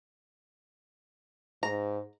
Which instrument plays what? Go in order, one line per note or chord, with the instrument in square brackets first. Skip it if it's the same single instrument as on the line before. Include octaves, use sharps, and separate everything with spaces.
[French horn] G#2 [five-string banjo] A#5